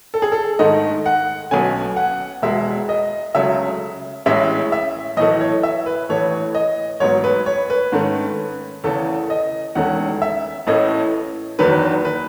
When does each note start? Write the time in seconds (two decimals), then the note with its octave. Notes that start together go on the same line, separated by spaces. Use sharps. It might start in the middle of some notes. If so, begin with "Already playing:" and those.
0.14 A4
0.22 G#4
0.32 A4
0.59 G#2 D#3 A3 D#5
1.06 F#5
1.51 B1 B2 A3 C#4 G#5
1.96 F#5
2.42 E1 E2 B2 G#3 E5
2.89 D#5
3.35 C#2 C#3 F#3 A3 C#4 E5
4.26 A1 A2 G#3 C#4 E5
4.72 E5
5.17 B1 A2 E3 A3 D#5
5.41 C#5
5.63 E5
5.86 B4
6.09 A1 A2 E3 A3 C#5
6.55 D#5
7.00 A1 G#2 F#3 B3 C#5
7.24 B4
7.46 C#5
7.70 B4
7.92 G#2 D#3 A3 C#4
8.84 E2 C#3 E3 A3 C#4 A4
9.30 D#5
9.75 E1 E2 D#3 A3 C#4 F#5
10.22 E5
10.67 A1 A2 E3 A3 C#4 D#5
11.59 F#1 E2 D#3 F#3 B4
12.05 B4